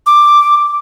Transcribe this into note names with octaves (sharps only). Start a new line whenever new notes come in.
D6